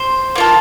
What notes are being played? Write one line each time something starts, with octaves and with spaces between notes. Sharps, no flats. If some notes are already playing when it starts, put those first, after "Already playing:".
Already playing: C5
A#3 F4 A4